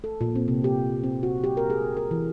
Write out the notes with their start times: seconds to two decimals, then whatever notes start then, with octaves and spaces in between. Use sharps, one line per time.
0.04 A4
0.21 A#2
0.36 C4
0.48 C3
0.64 G4
1.03 C4
1.23 F#4
1.44 G4
1.57 A#4
1.70 G#4
1.97 A#4
2.11 E3